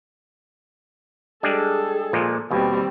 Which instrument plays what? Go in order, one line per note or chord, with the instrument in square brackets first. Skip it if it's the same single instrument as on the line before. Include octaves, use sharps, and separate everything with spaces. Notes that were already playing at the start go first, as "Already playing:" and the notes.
[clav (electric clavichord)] G3 G#3 D4 [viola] G#4 A4
[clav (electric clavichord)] A#2 F3 G#3
[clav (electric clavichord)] D#2 B2 [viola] G3 C4